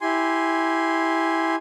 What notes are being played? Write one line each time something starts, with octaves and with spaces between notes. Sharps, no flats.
E4 G4 G#5 C6